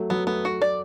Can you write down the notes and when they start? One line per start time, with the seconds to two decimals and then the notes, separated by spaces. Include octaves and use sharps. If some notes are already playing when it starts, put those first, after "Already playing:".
Already playing: F#3 A3
0.10 F#3 B3
0.27 A3 B3
0.45 F#4
0.62 D5